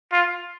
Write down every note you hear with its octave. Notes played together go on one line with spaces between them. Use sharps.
F4